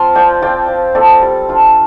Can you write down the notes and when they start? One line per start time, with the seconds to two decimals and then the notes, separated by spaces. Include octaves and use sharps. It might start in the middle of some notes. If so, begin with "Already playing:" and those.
Already playing: C4 F4 F5 A5 C6
0.15 F3 D5 G5
0.42 C4 F4 D5 G5
0.68 F3
0.95 C4 F4 A4 D5
1.22 G3
1.49 D4 F4